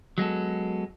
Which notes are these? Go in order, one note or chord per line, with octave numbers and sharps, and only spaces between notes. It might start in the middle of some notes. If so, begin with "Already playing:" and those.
F#3 G#3 B3 A4